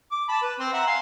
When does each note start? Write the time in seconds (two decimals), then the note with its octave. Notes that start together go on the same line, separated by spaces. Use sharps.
0.11 D6
0.29 A5 B5
0.42 B4
0.60 C4 C6
0.73 E5 F#5 A#5
0.87 F5 G#5 C6